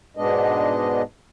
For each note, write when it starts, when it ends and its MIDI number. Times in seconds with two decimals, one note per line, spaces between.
0.17 1.02 44
0.17 1.02 47
0.17 1.02 56
0.17 1.02 59
0.17 1.02 62
0.17 1.02 75